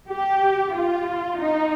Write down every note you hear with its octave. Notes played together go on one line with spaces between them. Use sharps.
G4
F4
D#4